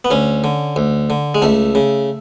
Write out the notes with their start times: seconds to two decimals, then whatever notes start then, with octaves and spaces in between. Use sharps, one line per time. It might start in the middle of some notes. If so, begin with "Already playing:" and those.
0.05 B3
0.11 D2 C#4
0.44 D3
0.76 D2
1.10 D3
1.35 G#3
1.42 C#2 A3
1.75 C#3